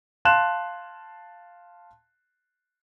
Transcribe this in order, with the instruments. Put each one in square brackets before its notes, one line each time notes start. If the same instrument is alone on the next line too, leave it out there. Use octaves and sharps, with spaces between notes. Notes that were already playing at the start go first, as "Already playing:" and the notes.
[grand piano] F5 A5 C6 F#6 E7